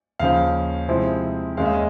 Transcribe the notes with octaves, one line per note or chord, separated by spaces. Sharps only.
D#2 C#3 F3 F5
C3 F3 G#3 C4 E4
D#2 D#3 G#3 C#4 F5
E5
D#5